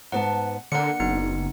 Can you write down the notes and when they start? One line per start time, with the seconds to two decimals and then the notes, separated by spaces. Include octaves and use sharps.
0.12 G#2 B3 F#5 A5
0.72 D3 A#3 D4 F#5 C#7
1.00 F#1 B3 D#4 C#7